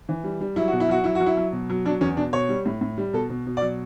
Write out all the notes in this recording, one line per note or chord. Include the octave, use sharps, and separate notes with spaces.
E3
G3
G3
F#3 E4
F#4
B2
E4
F#3 F#4
F#3 E4
F#4
F#3
E4
F#3
B2
F#3
F#3 D4
E2 C#4
B2 D4
B2 C#5
G3
A2
A2
G3
B2 A4
B2
B2
D5
F#3